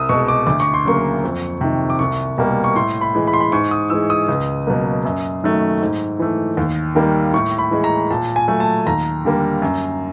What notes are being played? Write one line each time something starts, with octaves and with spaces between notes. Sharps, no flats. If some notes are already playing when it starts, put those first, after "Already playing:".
Already playing: C2 D#6 E6
B2 G#3 C#6
D6
D2 D6
C#6
C6
C#3 F#3 A#3 C#6
F2
C3 D#3
D6
C2 C#6
B2 G3 A#3
C#6
A2 C6
B5
E3 G#3
B5
C6
B5
G#2 C#6
D#6
E3 G#3 E6
D#6
C#2
B2 F#3 A#3
F#2
D#3 F#3 A3
G#2
E3 A3
D#2
D#3 G3 A#3
A2 C#6
B5
E3 G#3
A#5
A#2 A5
G#5
F#3 A3
A5
D#2 A#5
D3 G3 A#3
F#2